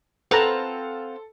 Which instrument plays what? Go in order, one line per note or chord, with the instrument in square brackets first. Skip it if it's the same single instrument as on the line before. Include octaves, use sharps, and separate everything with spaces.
[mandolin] C4 F4 F#5 [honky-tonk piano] A4 [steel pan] B4 A#5